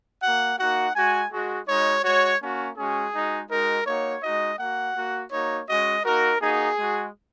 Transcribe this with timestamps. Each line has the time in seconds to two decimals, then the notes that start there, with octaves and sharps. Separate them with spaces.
0.22 A#3 F#4 F#5
0.59 A#3 D#4 F#4 F#5
0.95 G#3 F#4 G#5
1.32 G#3 F#4
1.68 G#3 D#4 F#4 C#5
2.04 G#3 F#4 C#5
2.41 A#3 C#4 F#4
2.77 G#3 C#4 F#4 G#4
3.13 G#3 D#4 F#4
3.50 G#3 D#4 F#4 A#4
3.86 A#3 D#4 F#4 C#5
4.23 G#3 D#4 F#4 D#5
4.59 A#3 F#4 F#5
4.96 A#3 F#4
5.32 A#3 D#4 F#4 C#5
5.68 G#3 C#4 F#4 D#5
6.05 A#3 D#4 F#4 A#4
6.41 A#3 D#4 F#4 G#4
6.78 G#3 F#4